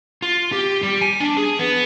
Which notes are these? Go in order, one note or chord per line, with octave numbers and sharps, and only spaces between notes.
F4
G4
G3
G#5
D4
G#4
B3